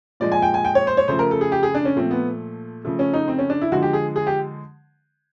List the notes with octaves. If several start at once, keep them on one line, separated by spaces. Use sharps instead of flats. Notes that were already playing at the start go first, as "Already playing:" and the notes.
A#2 F3 G#3 D5
G#5
G5
G#5
G5
C#5
C5
C#5
C#3 F3 A3 C5
A#4
A4
G#4
G4
G#4
D4
C#4
A#2 F3 A3 C4
B3
C#3 F3 A3
C#4
D#4
C4
C#4
D4
E4
D3 F3 G#3 F#4
G4
G#4
G#4
G4